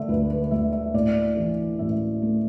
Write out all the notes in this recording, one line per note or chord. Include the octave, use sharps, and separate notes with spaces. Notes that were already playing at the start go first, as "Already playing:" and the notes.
Already playing: D3 A3 D5 E5
D2 B4
B4
D2 E5
E5
A2 D5
E3
A1 E5
A3